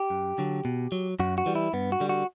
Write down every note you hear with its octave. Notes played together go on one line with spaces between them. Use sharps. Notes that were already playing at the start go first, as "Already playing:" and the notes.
Already playing: G4
F#2
D3 F#3
B2
F#3
F#2 F#4
F#4
E3 G3
E4
G2 B3
F#4
D3 G3
F#4